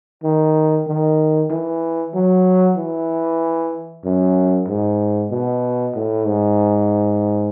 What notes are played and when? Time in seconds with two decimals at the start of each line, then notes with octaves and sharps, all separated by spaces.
0.23 D#3
0.88 D#3
1.50 E3
2.14 F#3
2.77 E3
4.05 F#2
4.68 G#2
5.31 B2
5.95 A2
6.26 G#2